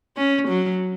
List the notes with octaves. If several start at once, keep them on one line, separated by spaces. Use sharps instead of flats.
C#4
F#3